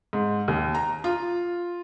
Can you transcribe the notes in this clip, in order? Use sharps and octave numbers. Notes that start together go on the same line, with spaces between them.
G#2
D#2
A#5
F4